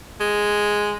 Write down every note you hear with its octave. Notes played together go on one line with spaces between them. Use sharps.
G#3